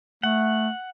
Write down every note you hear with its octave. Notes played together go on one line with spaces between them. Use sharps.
A3 F#5